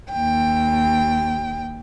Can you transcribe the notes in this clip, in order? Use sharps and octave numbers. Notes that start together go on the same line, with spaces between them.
D#2 G5